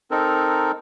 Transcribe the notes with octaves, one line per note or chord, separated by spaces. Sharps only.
C4 D#4 A4 A#4